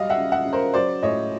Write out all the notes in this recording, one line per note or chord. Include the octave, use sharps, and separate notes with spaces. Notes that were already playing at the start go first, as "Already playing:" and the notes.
Already playing: F#3 G3 D#5 F5
E5 F#5
C#3
E5 F#5
C#3
A#4 C5
F#3 C5 D5
A2 C#5 D#5